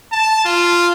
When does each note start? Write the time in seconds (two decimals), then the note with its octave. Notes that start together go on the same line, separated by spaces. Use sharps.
0.12 A5
0.45 F4